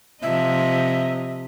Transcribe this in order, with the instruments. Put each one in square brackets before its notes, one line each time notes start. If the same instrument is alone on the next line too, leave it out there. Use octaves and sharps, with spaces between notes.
[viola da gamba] C3 F3 D#5 [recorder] E5